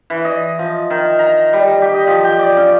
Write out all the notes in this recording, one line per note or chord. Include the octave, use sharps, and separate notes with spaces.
E3
D#5
F3
D#3
A#5
G3
G4
D#5
F3
G5
D5
C#3